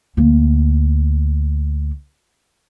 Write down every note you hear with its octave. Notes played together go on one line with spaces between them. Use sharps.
D2 A#3